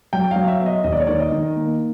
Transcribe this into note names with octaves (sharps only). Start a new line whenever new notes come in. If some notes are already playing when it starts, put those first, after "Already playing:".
F#3 G5
F#3 F5
E5
B3
D#5
D#2 D#5
D5
C#5
D#3 D5
D#5
D#3
A#3